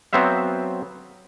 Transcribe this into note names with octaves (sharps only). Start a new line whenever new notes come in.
F#3 B3 C4 C5 E5 F5